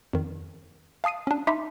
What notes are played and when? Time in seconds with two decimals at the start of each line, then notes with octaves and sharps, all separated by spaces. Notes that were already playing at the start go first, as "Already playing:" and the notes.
0.13 F2 D#3
1.04 F5 A5 D#6 C7 D#7
1.27 C#4 D4
1.47 D#4 E5 B5 C6 D6 B6